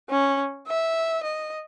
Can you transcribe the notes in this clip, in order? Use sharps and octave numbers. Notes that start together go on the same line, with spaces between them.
C#4
E5
D#5